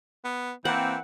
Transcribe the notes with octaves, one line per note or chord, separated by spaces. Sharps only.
B3
E3 A#3 C4 F#5